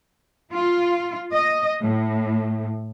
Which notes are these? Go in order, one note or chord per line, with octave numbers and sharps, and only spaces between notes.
F4
D#5
A2